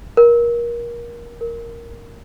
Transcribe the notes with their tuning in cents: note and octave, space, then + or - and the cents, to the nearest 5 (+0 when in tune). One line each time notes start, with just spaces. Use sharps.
A#4 +25
A#4 +0